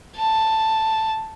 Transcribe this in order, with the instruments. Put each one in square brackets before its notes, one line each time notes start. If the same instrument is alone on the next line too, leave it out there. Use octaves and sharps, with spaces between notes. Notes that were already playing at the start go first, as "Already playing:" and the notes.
[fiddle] A5